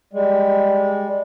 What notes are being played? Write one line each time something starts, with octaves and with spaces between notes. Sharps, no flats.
G3 G#3